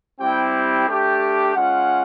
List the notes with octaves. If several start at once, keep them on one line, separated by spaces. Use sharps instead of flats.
G3 C4 E4 G4 G5
A3 D4 G4
G#3 C#4 F4 F#5